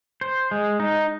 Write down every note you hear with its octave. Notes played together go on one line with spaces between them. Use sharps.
C5
G#3
D#4